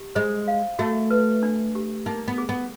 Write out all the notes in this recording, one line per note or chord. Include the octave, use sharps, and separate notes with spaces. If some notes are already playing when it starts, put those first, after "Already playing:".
Already playing: G4
G#3 C5
F5
A3 F#4
B4
D4
G4
A#3 D#4
B3
G#4
B3